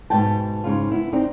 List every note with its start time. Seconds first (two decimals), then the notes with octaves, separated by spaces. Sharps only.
0.10 G#2 B2 B4 G5 A5
0.64 G#2 C#3 F4
0.92 B3 E4
1.13 C4 D4 D#4